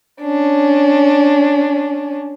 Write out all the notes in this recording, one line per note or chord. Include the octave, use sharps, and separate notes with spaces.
C#4 D4